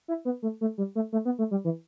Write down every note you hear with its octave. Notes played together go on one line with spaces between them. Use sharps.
E4
B3
A3
A3
G3
A3
A3
B3
A3
G3
E3